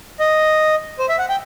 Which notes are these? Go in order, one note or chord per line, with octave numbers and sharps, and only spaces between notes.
D#5
C5
E5
F#5
G5